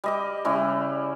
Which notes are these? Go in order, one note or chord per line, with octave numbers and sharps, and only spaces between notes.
G3 D#5 D6
C#3 G3 E4 C#6